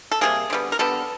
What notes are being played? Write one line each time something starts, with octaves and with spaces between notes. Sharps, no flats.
A4
C3 D#3 G3 A#3 G#4
D3 G3 B3
A#4
D3 G3 B3 A4